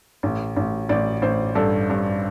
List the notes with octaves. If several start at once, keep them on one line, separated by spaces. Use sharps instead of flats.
A1
A1
A1 D5
A1 C5
G2 A4
G2